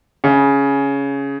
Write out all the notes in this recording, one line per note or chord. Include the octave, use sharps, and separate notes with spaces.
C#3